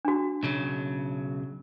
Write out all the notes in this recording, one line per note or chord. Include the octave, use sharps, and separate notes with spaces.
D4 F#4
B1 C#3 F#3